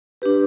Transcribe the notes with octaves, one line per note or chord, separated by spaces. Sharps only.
D4 G4 B4